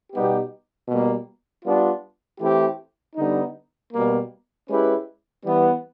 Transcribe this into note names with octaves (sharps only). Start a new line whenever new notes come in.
B2 G3 B3 D#4 G4
B2 G3 A#3
G3 B3 D4 F4
E3 A3 C4 E4 G4
D3 G3 B3 D#4
B2 G3 A#3
G#3 C#4 E4 G4 B4
E3 G3 B3